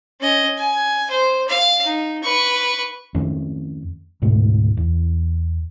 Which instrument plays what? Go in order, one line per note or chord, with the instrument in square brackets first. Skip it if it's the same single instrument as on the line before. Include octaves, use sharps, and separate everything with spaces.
[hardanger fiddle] C#4 D#5
G#5
C5
F5
D#4
B4 C#6
[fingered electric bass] F2 D#3 A3 C#4
D2 G#2 B2 A3
E2